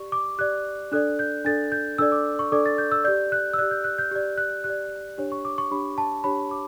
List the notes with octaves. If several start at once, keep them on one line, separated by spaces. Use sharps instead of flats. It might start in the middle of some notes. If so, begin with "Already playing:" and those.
Already playing: G4 D5 C#6
D6
G4 D5 F#6
D4 A4 D5 F#6
G6
D4 A4 D5 A6
G6
D4 A4 D5 E6
D6
C#6
D4 A4 D5 D6
A6
G6
E6
G4 D5 G6
F#6
E6
G4 D5 F#6
G6
F#6
G6
G4 D5
F#6
G4 F#6
D5
D4 G4 C#5
C#6
D6
C#6
D4 G4 C#5 B5
A5
D4 G4 C#5 B5
D6